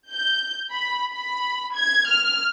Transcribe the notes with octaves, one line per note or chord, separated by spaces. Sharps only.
G6
B5
B5
G#6
F6